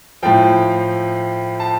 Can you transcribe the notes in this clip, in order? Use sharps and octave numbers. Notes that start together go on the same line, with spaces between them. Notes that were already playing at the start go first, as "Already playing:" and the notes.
A2 F3 G5
A5